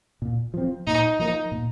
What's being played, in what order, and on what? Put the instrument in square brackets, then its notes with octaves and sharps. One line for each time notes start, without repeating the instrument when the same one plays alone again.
[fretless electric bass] A#2
F3 C4
[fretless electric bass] A#2 [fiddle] D#4
[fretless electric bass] F3 A#3 [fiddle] D#4
[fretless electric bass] A#2